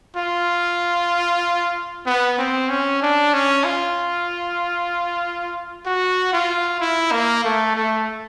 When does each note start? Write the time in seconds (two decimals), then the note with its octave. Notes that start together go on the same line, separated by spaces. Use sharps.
0.17 F4
2.06 B3
2.38 C4
2.70 C#4
3.02 D4
3.34 C#4
3.64 F4
5.86 F#4
6.33 F4
6.80 E4
7.12 A#3
7.44 A3
7.76 A3